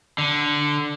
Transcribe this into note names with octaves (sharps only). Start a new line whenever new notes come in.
D3